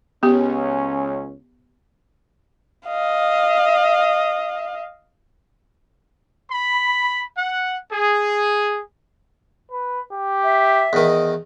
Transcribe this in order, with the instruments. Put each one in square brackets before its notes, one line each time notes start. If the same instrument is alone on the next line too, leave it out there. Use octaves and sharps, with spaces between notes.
[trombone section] C#2 C#4 [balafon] B3 G4
[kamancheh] D#5 F5
[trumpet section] B5
F#5
G#4
[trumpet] B4
G4
[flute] E5
[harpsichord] E2 D#3 [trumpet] D#5